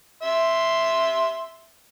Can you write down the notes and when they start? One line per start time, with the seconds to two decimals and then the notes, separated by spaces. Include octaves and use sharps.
0.23 E5 C6